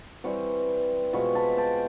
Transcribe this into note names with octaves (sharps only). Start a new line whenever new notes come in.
E3 G3 C4 B5 C#6
B2 G#3 C4 F4 B5 C#6
A5 B5
G5 A5